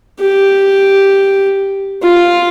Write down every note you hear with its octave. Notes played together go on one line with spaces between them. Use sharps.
G4
F4